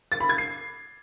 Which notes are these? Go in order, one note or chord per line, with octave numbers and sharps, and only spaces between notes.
A6
B5
G#6
C7